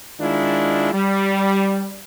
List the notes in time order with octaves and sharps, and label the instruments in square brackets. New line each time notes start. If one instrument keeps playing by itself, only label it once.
[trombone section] D#3 G#3 D4 E4 F4
G3